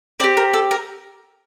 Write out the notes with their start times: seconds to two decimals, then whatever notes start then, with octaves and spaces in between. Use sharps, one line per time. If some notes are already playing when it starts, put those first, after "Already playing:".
0.20 C4 D5
0.24 G4
0.37 A#4
0.53 A4
0.71 A#4